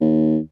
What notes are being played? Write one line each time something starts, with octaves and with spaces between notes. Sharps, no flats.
D#2